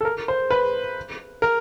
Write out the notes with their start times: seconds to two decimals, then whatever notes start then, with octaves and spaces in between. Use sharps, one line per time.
0.01 A4
0.05 A#4
0.28 C5
0.50 B4
1.42 A#4